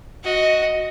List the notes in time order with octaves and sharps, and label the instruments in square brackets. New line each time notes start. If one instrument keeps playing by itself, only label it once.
[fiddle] F#4 D#5